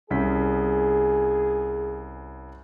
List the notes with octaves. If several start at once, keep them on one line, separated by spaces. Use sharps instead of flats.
C2 C#4 G#4 B6